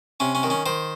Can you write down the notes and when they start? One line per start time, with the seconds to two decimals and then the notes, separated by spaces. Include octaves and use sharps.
0.20 C3 C#4
0.35 C#4
0.43 D#3
0.50 C#4
0.66 D#3 C5